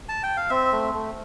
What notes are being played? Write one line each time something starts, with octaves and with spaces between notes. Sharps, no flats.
A5
G5
F5
C4 E5
A3
A3